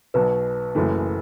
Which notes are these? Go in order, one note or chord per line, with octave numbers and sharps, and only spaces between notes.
B1 B2 F#3 B4
F#1 F#2 E3 A3